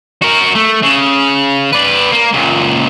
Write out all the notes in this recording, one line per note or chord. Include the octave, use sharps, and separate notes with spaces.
F#4 A#4
A3
C#3
B4 D5
A#3
C#2 A#2